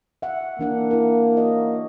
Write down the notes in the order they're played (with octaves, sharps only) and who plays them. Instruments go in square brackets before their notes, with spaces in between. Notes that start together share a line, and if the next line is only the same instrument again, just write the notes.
[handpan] E5 F#5
[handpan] E3 D4 F#5 [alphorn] A#3
[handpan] E4 A#4
F#4 C#5 D#5